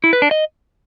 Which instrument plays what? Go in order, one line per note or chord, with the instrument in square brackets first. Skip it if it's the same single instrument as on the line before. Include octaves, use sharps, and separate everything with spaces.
[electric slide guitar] E4
B4
D4
D#5